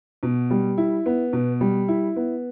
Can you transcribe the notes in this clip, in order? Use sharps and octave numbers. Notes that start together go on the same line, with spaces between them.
B2
G3
E4
B3
B2
G3
E4
B3